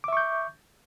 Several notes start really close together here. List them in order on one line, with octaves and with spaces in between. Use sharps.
D6 E5 C#6 G6